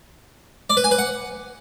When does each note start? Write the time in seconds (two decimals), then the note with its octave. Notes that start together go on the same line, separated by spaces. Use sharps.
0.70 D5
0.77 B4
0.84 G#5
0.91 B4
0.98 F#5